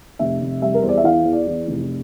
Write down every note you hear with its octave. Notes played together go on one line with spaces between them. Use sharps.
F1 E5
F1
G3 E5
A#4
E2 C5
D5
E5
E3 F5
E2
D5
E3
F1